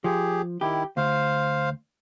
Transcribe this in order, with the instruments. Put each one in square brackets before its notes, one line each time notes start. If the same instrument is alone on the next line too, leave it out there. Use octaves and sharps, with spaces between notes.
[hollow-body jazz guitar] F3 [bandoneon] G4 G#4
[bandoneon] D#3 E4 [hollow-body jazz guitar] G4
[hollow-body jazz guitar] D2 [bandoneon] C5 F5